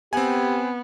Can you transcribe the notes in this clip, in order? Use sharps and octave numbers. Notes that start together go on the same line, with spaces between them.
B3 C4 G4 G#5